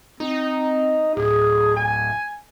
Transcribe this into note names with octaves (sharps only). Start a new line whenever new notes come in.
C4 D#4
D1 G#4
G#5